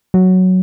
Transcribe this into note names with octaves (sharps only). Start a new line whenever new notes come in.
F#3